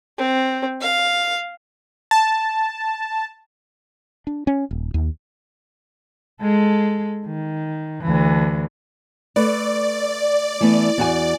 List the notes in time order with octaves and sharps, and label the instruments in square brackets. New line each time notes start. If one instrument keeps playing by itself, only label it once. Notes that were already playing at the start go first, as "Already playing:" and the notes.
[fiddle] C4
F5
[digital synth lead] A5
[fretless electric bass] D4
C#4
D#1
D#2
[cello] G#3 A4
D#3
D2 E3
[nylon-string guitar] A3 B4 [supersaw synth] D5
[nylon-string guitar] E3 A3 B3
E2 F#4 G#5